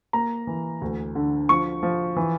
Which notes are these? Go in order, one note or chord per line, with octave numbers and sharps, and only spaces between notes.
A#3 A#5
E3
D2
D3
F3 C#6
F3
E3